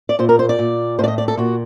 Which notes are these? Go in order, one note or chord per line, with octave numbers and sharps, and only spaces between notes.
D5
A#2 C5
A#4
C5
D5
A#2
A2 C5
D5
D#5
D5
A4
A#2 F#4